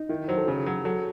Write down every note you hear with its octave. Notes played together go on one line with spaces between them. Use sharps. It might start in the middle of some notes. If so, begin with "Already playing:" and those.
Already playing: D#4
D#3 E4
F#3 C5
A4
C#3 G#4
F#3
F#3 A4